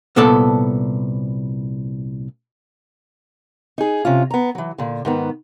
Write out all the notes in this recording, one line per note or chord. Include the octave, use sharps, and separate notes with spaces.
C2 A#2 B3 A4 D5 A5
D#4 G#4
C3 C#4 F4
B3 A#5
E3 F#3
A#2 D3
G#2 D#3 B3